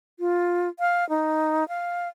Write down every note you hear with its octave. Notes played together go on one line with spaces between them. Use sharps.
F4
F5
D#4
F5